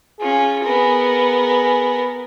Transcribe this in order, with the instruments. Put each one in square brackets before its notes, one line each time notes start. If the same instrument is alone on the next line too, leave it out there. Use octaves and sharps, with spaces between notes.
[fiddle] C#4 F4 [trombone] G#4
[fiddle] B3 A#4